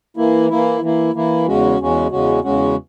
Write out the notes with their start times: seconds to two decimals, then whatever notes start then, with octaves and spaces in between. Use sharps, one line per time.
0.17 E3 A#3 E4
0.49 E3 A#3 E4
0.81 E3 A#3 E4
1.14 E3 A#3 E4
1.46 E2 C#3 G#3 C#4 F#4
1.79 E2 C#3 G#3 C#4 F#4
2.11 E2 C#3 G#3 C#4 F#4
2.44 E2 C#3 G#3 C#4 F#4